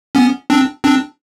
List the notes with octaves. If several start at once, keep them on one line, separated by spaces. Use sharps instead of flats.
B3 C#4
C4 D4
C4 D4